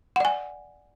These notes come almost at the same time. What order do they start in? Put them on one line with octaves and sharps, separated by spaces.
F#5 D5 G#5